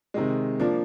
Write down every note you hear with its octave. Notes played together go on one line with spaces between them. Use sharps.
C3 D#3 G#3
F3 A#3 D4